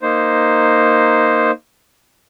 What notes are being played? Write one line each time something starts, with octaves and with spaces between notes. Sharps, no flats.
A#3 D#4 C5